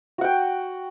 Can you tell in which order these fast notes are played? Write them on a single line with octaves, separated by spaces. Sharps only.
F#4 F#5 G5